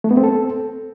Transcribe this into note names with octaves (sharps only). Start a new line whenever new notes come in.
A3
B3
C4
A4